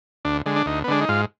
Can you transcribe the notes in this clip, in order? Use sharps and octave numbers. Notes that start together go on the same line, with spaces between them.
D2 D4
D3 G#3
D4
D2 D#4
B3
D3 G#3 D4
D#4
G#2 F4